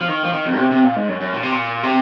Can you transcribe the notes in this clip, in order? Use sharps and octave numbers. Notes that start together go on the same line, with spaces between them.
F3
D#3
F3
D#3
F2
C3
C3
A#2
G#2
F#2
F#2
A#2
C3
A#2
C3